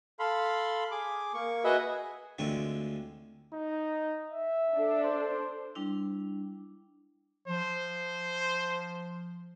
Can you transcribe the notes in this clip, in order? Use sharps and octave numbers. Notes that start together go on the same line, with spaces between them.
A4 F5 B5 C6
G#4 D6
A#3 C#6
F#4 G#4 B4 D#5 E5 F#5
G#4
D2 D3 G#3 C4 F4 C#6
D#4
E5
D4 A4
C5
G3 D4 E4
F3 C5